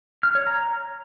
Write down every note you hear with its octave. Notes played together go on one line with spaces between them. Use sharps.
F6
C#5
A#5